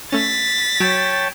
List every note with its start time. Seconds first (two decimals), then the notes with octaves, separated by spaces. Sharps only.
0.12 A3 C#4 A6 B6
0.80 F#3 C#5 G5 A5